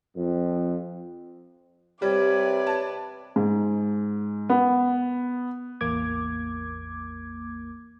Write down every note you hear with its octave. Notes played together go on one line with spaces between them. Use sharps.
F2
C3 G3 B4 C#5 D5
A5
G#2
B3
A1 E2 A#3 D6 G#6